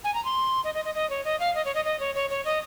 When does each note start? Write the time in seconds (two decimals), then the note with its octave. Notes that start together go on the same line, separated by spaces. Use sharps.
0.04 G#5
0.14 A#5
0.25 C6
0.64 D#5
0.74 D#5
0.85 D#5
0.95 D#5
1.10 C#5
1.25 D#5
1.40 F5
1.55 D#5
1.65 C#5
1.75 D#5
1.85 D#5
2.00 C#5
2.15 C#5
2.30 C#5
2.45 D#5